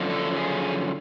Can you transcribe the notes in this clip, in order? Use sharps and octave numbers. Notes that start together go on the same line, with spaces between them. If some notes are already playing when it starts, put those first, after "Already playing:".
Already playing: F#2 D3 F3
A4
G#4